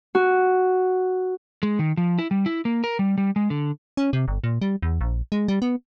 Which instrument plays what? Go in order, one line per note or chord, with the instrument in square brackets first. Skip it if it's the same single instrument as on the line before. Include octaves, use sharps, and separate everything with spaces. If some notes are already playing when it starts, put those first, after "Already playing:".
[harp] F#4
[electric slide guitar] G#3
D#3
F3
E4
G3
E4
A#3
A#4
G3
G3
G#3
D3
[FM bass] C#4
C3
G1
A#2
G3
E2
A#1
G#3
G3
B3